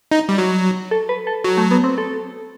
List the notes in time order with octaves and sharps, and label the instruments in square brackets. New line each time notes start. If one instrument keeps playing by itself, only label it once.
[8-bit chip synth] D#4
G3
F#3
[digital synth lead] A4
B4
A4
[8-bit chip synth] F#3
[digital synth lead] A3
B3
C4
A4